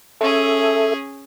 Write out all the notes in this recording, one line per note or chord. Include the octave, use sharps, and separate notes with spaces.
C#4 G#4 A4 E5